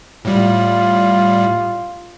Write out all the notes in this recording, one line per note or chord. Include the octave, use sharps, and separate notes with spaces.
A2 G3 F4